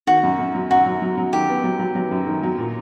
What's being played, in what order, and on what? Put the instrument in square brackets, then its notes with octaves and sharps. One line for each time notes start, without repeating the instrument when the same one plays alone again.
[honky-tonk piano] D#3 [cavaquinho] F#4
[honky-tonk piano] F#2
F#2
F#3
[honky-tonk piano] F#2 [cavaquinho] F#4
[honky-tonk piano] F#3
F#3
F#3
[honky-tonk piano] D#3 [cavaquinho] G4
[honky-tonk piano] B3
F#3
F#3
F#3
F#2
D#3
F#3
A#2